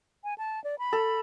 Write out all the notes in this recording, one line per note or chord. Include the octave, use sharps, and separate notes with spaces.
G#5
A5
D5
B5
A4